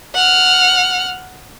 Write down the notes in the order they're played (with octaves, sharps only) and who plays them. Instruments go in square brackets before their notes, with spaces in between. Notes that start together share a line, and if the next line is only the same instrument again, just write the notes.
[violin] F#5 F6